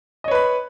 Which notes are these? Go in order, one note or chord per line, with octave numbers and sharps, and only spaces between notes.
B4 C#5 D#5 B5